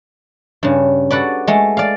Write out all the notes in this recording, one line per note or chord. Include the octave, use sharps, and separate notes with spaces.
G2 C#3
F#4 A4 B4 D5
G#3 A3
D5 F5